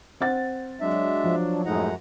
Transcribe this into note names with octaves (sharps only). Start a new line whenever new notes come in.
C4 F#5 A6
F#3 G#3 D4 E5
F3
F#2 A2 G#3 D#4 F#5 A#5